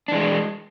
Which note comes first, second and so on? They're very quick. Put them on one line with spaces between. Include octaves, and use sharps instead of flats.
D4 E3 G#3